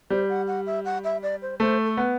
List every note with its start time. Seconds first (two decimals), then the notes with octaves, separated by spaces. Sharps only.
0.10 G3 C5
0.29 F#5
0.48 F#5
0.67 E5
0.85 F#5
1.04 E5
1.23 D5
1.42 C5
1.60 A3 C5
1.85 A4
1.97 B3